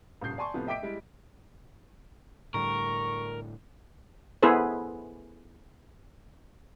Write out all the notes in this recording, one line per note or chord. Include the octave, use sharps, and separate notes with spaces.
D#1 G2 C#3 G6 C7
D5 G#5 A5 C6 C#6
A2 C3 F3 B3
D#5 E5 G5 D6 B6 D7
G3 G#3 E4
A2 D3 G3 A#4 C#6
B3 E4 G#4 A4 B4 C5